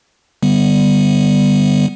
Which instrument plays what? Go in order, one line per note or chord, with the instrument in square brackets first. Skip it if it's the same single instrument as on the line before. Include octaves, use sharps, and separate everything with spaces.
[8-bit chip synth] D3 G3 B3